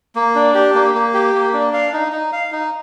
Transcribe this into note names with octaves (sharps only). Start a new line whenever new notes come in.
A#3
D4
G4
A#3
A#3
G4
A#3
D4
F5
D#4
D#4
F5
D#4